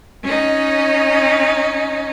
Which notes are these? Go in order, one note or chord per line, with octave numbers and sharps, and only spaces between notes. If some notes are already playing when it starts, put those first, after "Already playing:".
C#4 D#4